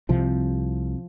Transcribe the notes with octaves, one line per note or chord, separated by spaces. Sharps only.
C2 C3 F3